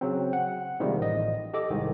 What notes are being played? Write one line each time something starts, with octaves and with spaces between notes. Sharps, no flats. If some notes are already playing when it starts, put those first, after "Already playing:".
C#3 F#3 C4
F#5
C3 D#3 F3 G3 G#3 A#3
A1 D#5
G4 A4 D#5 D6
C2 G#2 D#3